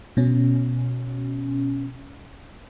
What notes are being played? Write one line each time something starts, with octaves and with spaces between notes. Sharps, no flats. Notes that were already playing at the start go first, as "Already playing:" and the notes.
B2 C#4